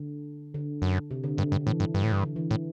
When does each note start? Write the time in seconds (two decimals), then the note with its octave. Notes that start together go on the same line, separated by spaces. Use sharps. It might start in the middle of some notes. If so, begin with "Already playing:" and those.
Already playing: D3
0.54 D3
0.82 F#2
1.11 C3
1.24 D3
1.38 G2 D3
1.52 G2 D3
1.67 A2 E3
1.80 G2
1.94 G2
2.03 A2
2.12 G2
2.23 D3
2.36 E3
2.51 A2